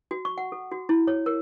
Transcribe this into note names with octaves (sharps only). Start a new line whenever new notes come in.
F#4
C#6
F#5
A4
F#4
E4
C#5
A#4